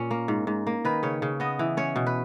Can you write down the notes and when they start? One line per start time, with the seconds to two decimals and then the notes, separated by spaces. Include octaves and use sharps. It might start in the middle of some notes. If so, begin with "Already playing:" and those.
Already playing: A#2 C#4
0.11 A#3
0.28 G#2
0.47 G#2
0.67 A#3
0.85 D#3 B4
1.03 C#3 C#5
1.22 C#3
1.40 B3 D#5
1.59 E3
1.77 C#4 C#5
1.96 B2
2.07 B4